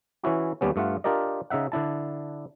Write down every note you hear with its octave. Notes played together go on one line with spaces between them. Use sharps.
E3 C#4 E4 F#4
D#2 G3 B3 C#4
G2 A3 F4 F#5
D4 F4 G4 A#4 D5 D#5
C#3 D#4 E5 F#5
D3 D4 E4 A5